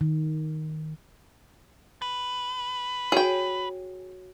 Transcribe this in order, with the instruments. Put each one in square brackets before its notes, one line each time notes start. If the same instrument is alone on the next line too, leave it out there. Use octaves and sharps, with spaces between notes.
[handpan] D#3
[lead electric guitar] B4
[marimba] F#4 C#5 [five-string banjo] G#4 G5